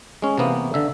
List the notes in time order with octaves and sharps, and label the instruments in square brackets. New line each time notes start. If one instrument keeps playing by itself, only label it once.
[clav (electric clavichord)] G#3 C#4
C3 E3 A#3 B3
D3 E5